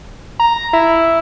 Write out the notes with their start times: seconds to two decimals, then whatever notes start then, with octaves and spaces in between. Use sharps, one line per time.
0.40 A#5
0.73 E4